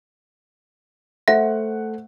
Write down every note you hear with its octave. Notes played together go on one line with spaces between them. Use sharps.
A3 C5 E5 F#5 A#6